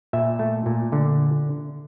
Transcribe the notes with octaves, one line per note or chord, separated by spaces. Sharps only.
A#2 E5
A3
A#2
D3